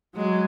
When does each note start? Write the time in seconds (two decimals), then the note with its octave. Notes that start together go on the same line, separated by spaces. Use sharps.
0.16 F#3 G#3